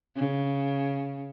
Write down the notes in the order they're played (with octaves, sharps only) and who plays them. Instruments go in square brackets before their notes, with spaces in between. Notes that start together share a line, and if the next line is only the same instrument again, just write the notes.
[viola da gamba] C#3